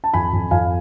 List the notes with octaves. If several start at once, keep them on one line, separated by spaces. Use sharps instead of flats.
A5
F2 G#5 B5
F2
F2 F5 G#5